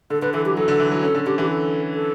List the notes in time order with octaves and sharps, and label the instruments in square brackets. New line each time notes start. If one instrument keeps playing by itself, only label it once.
[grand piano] D3 [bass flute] A4
[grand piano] D3 [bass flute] B4
[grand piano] E3 [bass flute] A4
[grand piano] F#3 [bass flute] G4
[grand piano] F#3 [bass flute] A4
[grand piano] D3
E3
F#3
[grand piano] C#4 [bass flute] A4
[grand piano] D3
[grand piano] D3 [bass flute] G4
[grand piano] E3 [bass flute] G4
[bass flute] A4
A4